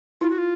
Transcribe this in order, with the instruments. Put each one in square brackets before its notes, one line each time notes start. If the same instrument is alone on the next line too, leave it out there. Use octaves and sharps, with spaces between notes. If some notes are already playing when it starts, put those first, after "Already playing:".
[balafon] E4 [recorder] F4
[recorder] F#4
F4